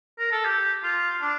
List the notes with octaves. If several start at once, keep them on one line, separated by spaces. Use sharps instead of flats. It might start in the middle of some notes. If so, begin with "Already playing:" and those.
A#4
A4
G4
F4
D4